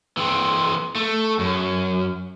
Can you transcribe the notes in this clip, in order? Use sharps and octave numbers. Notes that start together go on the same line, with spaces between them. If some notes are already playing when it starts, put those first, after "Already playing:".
E3 C4
A3
F#2